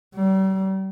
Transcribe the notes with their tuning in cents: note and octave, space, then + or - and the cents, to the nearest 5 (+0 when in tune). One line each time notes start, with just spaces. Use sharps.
G3 -40